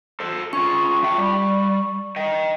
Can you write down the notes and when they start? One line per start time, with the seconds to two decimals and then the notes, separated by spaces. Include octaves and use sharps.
0.20 A4 C5
0.53 C#4 F4 C#6
1.02 F#3 E5 G5
1.18 G3
2.16 D#5 G5